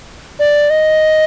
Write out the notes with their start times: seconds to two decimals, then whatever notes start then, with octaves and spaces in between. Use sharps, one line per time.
0.39 D5
0.70 D#5